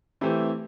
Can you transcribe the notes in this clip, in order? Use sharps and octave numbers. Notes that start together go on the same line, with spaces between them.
E3 A3 C4 E4 G4